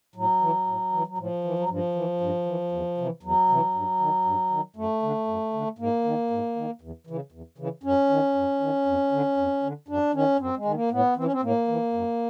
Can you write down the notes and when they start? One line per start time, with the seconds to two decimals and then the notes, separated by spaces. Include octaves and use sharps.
0.15 A2 F#3
0.41 E3
0.67 A2
0.92 E3
1.07 F#3
1.18 A2 F3
1.44 E3
1.59 F#3
1.69 G2 F3
1.95 E3
2.21 G2
2.46 E3
2.72 E2
2.98 C3 E3
3.23 E2 F#3
3.49 C3 E3
3.74 G2
4.00 D#3
4.25 G2
4.50 D#3
4.76 F#2 A3
5.02 D3
5.27 F#2
5.53 D3
5.78 G#2 A#3
6.04 D#3
6.30 G#2
6.56 D#3
6.81 E2
7.07 C#3 E3
7.32 E2
7.58 C#3 E3
7.83 F#2 C#4
8.09 D#3
8.35 F#2
8.60 D#3
8.86 F2
9.12 D3
9.37 F2
9.63 D3
9.88 F#2 D4
10.14 D#3 C#4
10.40 F#2 C4
10.57 G#3
10.65 D#3
10.74 A#3
10.91 A2 B3
11.16 E3 C4
11.24 C#4
11.32 C4
11.42 A2 A#3
11.68 E3
11.93 F#2